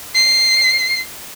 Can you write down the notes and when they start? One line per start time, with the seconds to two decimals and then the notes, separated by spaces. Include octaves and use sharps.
0.15 C7